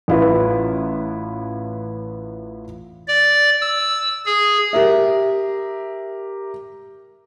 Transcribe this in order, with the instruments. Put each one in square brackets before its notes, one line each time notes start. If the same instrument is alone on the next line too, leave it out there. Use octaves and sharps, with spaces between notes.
[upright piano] A1 E4 F4 B4
[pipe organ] D5
E6
G#4
[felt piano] G4 A#4 E5